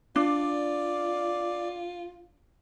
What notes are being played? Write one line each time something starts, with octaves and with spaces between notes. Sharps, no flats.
D4 F4 D5